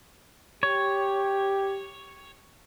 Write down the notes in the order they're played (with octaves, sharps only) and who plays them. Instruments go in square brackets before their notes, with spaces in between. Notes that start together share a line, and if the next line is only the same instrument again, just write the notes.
[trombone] G4 [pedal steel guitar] C#5